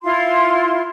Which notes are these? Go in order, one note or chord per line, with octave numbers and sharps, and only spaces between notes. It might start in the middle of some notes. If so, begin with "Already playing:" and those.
E4 F4 C6